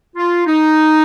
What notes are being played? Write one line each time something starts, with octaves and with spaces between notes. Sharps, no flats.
F4
D#4